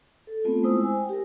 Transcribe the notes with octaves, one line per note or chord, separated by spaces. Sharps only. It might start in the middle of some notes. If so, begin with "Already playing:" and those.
A4
A3 B3 C4 F4
G#3 E4 C5 D#6 E6
G#5
G5
G4 A#4